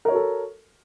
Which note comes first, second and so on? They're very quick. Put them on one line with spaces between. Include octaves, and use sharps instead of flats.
A#4 C#5 F#4 A4